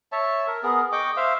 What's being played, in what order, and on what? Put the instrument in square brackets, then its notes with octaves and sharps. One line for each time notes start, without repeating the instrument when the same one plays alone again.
[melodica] C#5 E5 A5
A#4
B3 G#4 A#4
D#5 G5 C#6 D6
C5 E5 F5